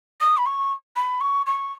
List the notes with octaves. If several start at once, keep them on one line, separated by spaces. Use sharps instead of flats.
D#6
B5
C#6
B5
C#6
C#6